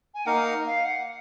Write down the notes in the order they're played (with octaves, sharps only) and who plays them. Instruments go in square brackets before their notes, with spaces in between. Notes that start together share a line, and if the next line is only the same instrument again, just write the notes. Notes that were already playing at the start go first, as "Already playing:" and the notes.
[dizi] G#5
[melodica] A#3 D#4 A#4 F5 [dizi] F#5
[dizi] F5
F#5